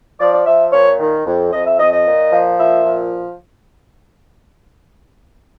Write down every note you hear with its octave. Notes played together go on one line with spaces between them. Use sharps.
F3 D5
D5
F3 E5
A#2 C#5
D#3
F2
F2 D#5
E5
F2 D#5
D#5
A#2
F3
A#2 E5
F3